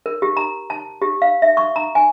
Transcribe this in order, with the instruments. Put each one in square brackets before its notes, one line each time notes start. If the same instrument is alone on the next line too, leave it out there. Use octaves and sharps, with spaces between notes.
[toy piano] A#4
G4
A#5
A5
G4
F5
E5
C#6
A#5
G#5